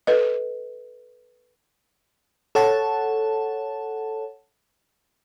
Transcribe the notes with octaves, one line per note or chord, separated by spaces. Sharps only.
A4 B4 D#5
A4 C#5 F#5 A5